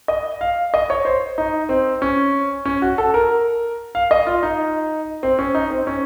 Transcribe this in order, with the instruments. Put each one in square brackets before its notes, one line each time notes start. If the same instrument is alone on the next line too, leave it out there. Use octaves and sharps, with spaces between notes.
[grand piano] D#5
F5
D#5
C#5
C5
D#4
C4
C#4
C#4
F#4
A4
A#4
F5
D#5
F4
D#4
C4
C#4
D#4
C4
C#4